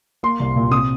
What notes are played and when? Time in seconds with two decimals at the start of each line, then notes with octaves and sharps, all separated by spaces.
0.23 A#3 C6
0.40 C2
0.56 A#2
0.71 C3 D#6